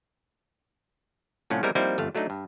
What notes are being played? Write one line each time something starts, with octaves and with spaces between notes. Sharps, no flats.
C2 A2 F3 C#4 F5 F#5
G3 G#3 B3 C4 E4 A#4
F3 G3 A#3 C4 D#4 E4
G1 F2 A3 F5
F#3 A3 D4 D#4
G2